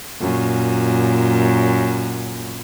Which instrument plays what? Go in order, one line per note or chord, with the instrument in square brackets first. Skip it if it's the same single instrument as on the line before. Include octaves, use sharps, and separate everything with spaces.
[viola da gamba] F#2 A#2